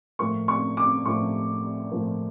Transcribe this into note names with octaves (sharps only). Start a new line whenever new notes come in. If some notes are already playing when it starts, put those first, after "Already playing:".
A2 F3 A#3 C#6
C#6
D6
A2 F3 A#3 C#6
A2 F3 A#3